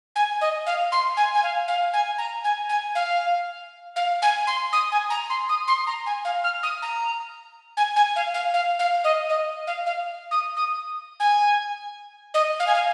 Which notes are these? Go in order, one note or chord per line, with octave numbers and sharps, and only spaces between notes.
G#5
D#5
F5
C6
G#5
G#5
F5
F5
G#5
A#5
G#5
G#5
F5
F5
G#5
C6
D#6
G#5
A#5
C6
D#6
C6
A#5
G#5
F5
F6
D#6
A#5
G#5
G#5
F5
F5
F5
F5
D#5
D#5
F5
F5
D#6
D#6
G#5
D#5
F5
G#5
F5